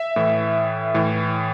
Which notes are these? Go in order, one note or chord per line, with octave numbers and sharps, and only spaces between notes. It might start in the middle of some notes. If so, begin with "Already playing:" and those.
Already playing: E5
A2 E3
A2 E3